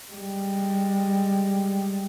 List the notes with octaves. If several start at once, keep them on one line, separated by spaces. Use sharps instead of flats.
G3 G#3